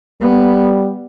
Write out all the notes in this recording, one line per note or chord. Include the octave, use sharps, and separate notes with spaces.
G3 B3